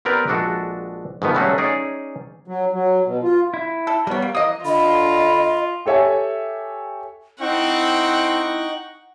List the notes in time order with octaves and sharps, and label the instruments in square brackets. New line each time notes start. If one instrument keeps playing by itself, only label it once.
[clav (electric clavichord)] B3 C4 G4 A#4 B4 D5
A#1 G#3 D4 F#4 A4
G#2 C3 D#3 F3 A3 B3
F#3 G3 A3 C#4 F#4 G#4
C#4 D#4 G#4 C#5 D5
[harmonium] F#3
F#3
B2
F4
[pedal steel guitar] E4
[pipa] A4
[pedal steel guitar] G3 B3 [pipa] A#4 C#5
[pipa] A#3
[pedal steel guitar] E3 D#6 [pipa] A#3 D#5
[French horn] D3 [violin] F4 [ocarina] D#5 [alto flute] B5
[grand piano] G4 A4 C#5 E5 G#5
[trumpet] C4 [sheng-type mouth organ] D#4 G5 C#6 [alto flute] E4 [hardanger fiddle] F#5